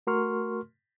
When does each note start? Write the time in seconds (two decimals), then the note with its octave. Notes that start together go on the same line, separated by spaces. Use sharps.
0.07 A3 F#4 A#4 C6 C#6 F6